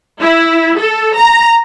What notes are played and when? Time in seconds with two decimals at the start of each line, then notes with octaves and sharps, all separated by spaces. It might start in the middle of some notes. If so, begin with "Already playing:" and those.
0.20 E4
0.79 A4
1.15 A#5